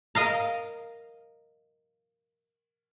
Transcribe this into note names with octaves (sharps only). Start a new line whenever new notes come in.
A#4 D#5 F5 A#5